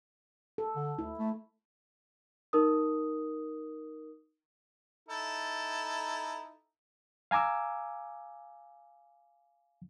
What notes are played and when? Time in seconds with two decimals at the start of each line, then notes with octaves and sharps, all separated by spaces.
0.58 A4
0.76 D3
0.99 D2 E4
1.18 A3
2.53 D#4 A#4 D#6
5.09 D#4 E4 A4
7.31 F5 G#5 A#5 D6 E6